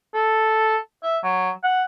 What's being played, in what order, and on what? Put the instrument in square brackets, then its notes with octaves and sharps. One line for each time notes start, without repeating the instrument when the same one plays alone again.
[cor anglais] A4
E5
F#3
F#5